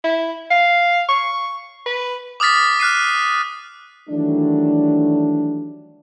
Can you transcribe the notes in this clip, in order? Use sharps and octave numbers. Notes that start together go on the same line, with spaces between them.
E4
F5
C#6
B4
D6 D#6 F6 A6 B6
F6 F#6 C7 D#7
D#3 E3 F#3 G3 A3 D4